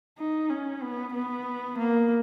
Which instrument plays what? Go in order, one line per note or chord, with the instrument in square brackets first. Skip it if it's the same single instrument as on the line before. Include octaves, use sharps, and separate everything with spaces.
[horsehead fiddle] D#4
C#4
B3
B3
A#3